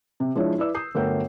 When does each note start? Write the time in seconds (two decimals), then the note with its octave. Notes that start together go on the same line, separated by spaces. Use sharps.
0.20 C3
0.36 F3 G#3 D4 E4 C#5
0.58 E4 B4 D5 E6
0.75 D#6 G6 C7
0.95 G1 F#3 A3 A#4 G5 G6